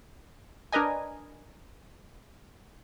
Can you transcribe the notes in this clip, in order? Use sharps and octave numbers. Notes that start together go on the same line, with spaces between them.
D4 A#4 B4 D#5 G#5